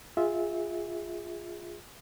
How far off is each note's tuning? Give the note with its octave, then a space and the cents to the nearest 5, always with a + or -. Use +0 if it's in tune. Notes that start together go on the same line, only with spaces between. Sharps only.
F4 +0 G#4 -15 E5 -20